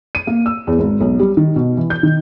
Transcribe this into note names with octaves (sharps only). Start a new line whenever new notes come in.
D#7
A#3
E6
E2
G#1
B1
G3
D#3
B2
E3
G6
D#3